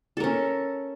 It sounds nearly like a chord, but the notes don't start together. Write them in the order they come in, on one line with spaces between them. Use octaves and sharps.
A4 A#4 C#4